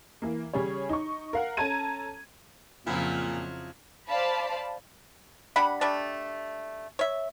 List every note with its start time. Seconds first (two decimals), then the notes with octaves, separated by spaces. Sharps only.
0.22 E3 A#3
0.54 C#3 G3 G#4 C#5
0.89 D#4 C#6
1.33 A#4 F5 F#5
1.57 C#4 A4 A5 A#5 G#6 D#7
2.87 F2 A#2 C#3 F3 F#3 E4
4.08 C5 D5 F5 A5 B5
5.56 G3 D4 F#5 B5
5.81 G3 A3 D4
6.99 C#5 E5